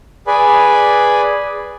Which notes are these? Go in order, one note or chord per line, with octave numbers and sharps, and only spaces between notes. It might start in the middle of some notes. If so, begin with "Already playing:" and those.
G#4 B4 D5 G#5 B5